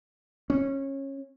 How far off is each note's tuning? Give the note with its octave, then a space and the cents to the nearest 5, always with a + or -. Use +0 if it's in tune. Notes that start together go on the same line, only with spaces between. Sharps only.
C#4 -20